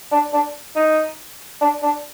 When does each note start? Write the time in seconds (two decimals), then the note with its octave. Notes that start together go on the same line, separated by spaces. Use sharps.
0.12 D4
0.33 D4
0.76 D#4
1.61 D4
1.83 D4